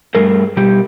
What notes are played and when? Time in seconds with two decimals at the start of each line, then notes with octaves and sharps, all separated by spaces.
0.15 G2 G3 A3 G#4 A#4
0.57 B2 G3 G4